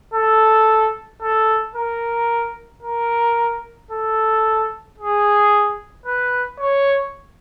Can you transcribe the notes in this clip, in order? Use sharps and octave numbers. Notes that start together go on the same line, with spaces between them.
A4
A4
A#4
A#4
A4
G#4
B4
C#5